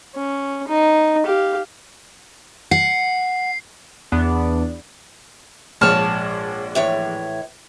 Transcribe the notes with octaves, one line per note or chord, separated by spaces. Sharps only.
C#4
D#4
G4 F5
F#5 C7
E2 B3 D4
A#1 G#2 C#5 A5 F6
A2 E3 C#5